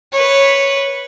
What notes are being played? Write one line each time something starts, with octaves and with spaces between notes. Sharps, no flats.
B4 C#5